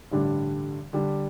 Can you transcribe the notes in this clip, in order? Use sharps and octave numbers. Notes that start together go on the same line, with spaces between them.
A1 G2 D3 G3 D4
D3 G3 D4